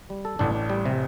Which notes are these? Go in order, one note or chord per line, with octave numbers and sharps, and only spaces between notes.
G3
A4
A1 A2 D4
D4
G3
C3